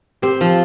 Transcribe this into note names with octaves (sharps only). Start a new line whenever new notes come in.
C4 G4
F3